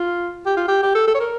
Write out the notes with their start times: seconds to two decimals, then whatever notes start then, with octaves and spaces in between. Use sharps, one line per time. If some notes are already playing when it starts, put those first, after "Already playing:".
Already playing: F4
0.46 G4
0.57 F4
0.68 G4
0.83 G4
0.95 A4
1.07 A4
1.15 C#5
1.20 A#4